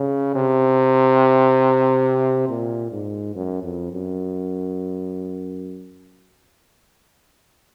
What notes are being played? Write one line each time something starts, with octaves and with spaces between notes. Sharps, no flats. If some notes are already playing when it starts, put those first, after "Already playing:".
Already playing: C#3
C3
A#2
G#2
F#2
F2
F#2